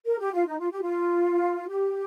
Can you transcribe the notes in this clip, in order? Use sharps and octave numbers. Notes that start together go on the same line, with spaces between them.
A#4
G4
F4
D#4
F4
G4
F4
G4